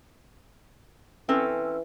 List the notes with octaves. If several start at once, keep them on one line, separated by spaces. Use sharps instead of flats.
E3 C4 C#4 A4